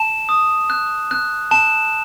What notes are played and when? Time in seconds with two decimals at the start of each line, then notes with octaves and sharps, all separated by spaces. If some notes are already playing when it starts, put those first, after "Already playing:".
Already playing: A5 E7
0.29 D#6
0.70 F#6
1.11 F#6
1.51 A5 E7